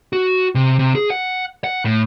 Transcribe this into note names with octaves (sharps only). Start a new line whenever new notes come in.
F#4
C3
C3
G#4
F#5
F#5
A2